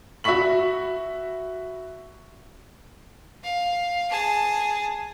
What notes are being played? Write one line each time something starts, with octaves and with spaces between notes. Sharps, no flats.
F#4 E5 B5 C#6 B6 F#7
F5
G#4 A5